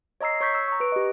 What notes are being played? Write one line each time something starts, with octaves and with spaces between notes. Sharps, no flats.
C#5 D#5 A#5 E6 C7
C#5 C#6 G6 B6
E6
A#5 C#6
B4 D7
G4 D#5